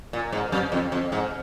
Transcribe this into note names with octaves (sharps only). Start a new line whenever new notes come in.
A#2
G#2
F#2
F2
F2
G#2